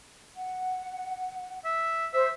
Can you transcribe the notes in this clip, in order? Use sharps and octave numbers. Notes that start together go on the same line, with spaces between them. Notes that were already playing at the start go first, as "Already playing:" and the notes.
F#5
E5
C5 E5